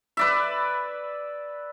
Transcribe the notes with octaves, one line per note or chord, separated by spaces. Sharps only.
B4 D5 E5